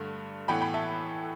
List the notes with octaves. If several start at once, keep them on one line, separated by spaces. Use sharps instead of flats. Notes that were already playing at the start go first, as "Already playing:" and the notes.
Already playing: G2 D3 A3
A2 E3 B3 G5 B5
G5 B5
E5 A5